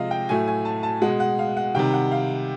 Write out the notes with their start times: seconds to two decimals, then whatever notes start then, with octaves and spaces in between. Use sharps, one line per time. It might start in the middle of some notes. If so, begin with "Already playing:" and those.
Already playing: C3 F3 G#3 D#5 F5
0.11 G5
0.29 A2 F#3 A3 G#5
0.48 G#5
0.65 A5
0.83 A5
1.02 B2 G#3 F#5
1.20 F#5
1.39 F5
1.57 F#5
1.74 C3 D#3 G3 G5
1.93 F#5
2.12 F5